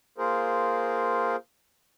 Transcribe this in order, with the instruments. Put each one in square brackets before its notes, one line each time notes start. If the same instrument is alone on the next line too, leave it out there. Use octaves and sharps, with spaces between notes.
[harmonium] A#3 F4 G#4 A#4 C5